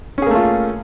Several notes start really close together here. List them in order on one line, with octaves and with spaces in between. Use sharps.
C#4 G#4 A#3 A3 F4